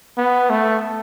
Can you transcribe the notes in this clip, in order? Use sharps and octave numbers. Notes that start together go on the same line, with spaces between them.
B3
A3